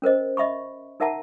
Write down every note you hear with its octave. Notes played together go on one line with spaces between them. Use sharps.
C#4 A#4 C5 D#5
D#5 E5 B5 C#6
D#4 A#4 E5 F#5 A5 A#5